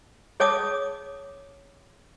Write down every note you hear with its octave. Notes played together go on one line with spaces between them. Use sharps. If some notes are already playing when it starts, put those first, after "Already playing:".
G#4 C#5 A5 D6 D#6